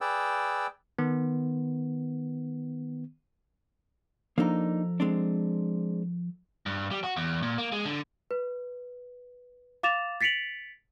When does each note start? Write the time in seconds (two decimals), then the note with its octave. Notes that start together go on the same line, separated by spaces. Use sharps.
0.01 G#4 B4 D5 G5 E6
0.99 D#3 B3
4.38 F3 A#3 D4 D#4 A4 A#5
5.00 G#3 C4 D4
6.66 G2
6.91 G3
7.04 F#4
7.17 E2
7.43 A#2
7.58 A#3
7.72 G#3
7.85 D3
8.31 B4
9.83 F5 D6 A6 E7 F7
10.21 A6 B6 C#7 D7 F7 F#7